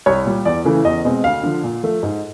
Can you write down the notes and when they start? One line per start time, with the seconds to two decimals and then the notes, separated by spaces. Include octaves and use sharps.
0.06 C2 C#5
0.26 A#2 G3
0.45 E2 D5
0.65 C#3 E3 A3
0.84 E2 D#5
1.05 B2 G#3 C4
1.24 D2 F5
1.43 D3 F3
1.64 A#2
1.83 F3 A3
2.03 G#2